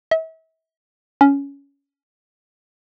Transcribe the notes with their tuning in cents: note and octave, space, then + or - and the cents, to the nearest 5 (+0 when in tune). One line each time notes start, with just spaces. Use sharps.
E5 -40
C#4 +15